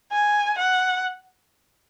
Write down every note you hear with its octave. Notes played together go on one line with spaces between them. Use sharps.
G#5
F#5